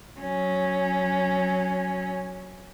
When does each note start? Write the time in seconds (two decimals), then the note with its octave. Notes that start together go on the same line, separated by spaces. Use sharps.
0.20 F#3 C#4